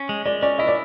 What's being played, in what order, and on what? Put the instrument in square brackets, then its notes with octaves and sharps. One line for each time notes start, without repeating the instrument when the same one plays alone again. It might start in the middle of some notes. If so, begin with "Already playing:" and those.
Already playing: [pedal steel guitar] C#4
G#3
[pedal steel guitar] G#3 [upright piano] D5
[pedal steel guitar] C#4 [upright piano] D5
[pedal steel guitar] E4 [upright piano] D#5
[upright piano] D5